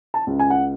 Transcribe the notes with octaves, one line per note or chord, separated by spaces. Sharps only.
A5
C#2
G#5
F#5